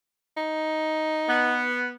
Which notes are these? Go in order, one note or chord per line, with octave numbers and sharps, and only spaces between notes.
D#4
B3